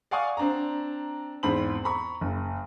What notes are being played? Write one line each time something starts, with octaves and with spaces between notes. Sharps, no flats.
D5 F5 F#5 G#5 C#6 D#6
C4 D4 A#5
E2 G#2 C4 B5 F#7
A#5 B5 C#6
F#1